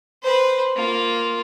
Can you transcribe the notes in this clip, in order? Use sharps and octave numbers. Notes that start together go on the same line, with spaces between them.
B4 C5
A#3 F4